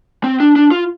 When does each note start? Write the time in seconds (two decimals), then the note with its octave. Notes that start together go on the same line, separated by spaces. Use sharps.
0.24 C4
0.40 D4
0.56 D4
0.71 F4